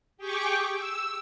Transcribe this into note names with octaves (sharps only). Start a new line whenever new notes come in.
G4 G#4 G5 C#6 D6
E6